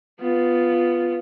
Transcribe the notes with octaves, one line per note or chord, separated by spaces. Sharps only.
B3 F4